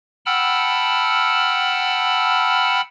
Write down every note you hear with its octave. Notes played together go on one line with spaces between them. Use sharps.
F#5 G5 A5 B5 E6 F6